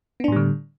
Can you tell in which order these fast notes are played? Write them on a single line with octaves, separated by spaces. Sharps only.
B3 D4 A2 G3 D3